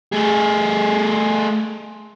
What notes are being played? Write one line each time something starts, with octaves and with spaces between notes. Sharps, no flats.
A3 G#4